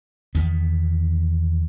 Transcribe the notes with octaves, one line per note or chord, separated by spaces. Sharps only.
E2 D#3 B3